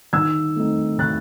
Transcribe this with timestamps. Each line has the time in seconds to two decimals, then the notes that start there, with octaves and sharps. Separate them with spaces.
0.13 D#3 E6 G#6
0.56 A3 C4 D#4
0.99 D#3 F#6 A6